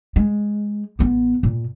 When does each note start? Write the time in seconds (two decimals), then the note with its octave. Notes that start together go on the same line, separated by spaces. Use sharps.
0.16 G#3
0.99 A1 B3
1.43 A#2